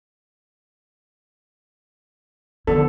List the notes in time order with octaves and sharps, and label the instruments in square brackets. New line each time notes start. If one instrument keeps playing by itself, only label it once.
[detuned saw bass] D3 [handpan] D#3 F3 B3 [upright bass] E4 [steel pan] A4